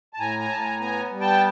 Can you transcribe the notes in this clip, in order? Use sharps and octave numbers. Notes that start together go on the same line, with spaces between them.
A5
A2 G#5 A#5
G#5 A#5
A2 A5
G#5 A#5
B3 G#5 A#5
G3
G5 A5